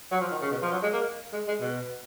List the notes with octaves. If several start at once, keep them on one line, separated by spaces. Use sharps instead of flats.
F#3
F3
D#3
C#3
B2
F3
F#3
G#3
A#3
G#3
G#3
B2